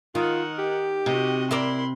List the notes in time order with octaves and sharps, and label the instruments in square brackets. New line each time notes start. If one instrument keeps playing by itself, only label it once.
[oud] D#3 [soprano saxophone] F4 [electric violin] A#4 F#5
[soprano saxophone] G4
[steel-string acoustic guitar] C3 [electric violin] F#4 D#5
[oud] E4 A#4 D5 [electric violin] B5 C6